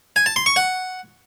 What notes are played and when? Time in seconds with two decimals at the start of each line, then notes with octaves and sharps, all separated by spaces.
0.16 G#5
0.26 A5
0.36 C6
0.46 C#6
0.56 F#5